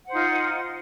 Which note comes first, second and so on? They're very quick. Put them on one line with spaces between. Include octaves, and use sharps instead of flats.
F#5 C5 D#4 F4